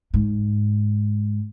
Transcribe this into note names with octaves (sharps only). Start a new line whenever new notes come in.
G#2